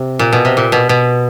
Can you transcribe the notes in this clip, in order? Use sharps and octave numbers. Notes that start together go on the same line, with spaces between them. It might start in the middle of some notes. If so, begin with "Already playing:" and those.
Already playing: C3
A#2
B2
C3
A#2
B2
B2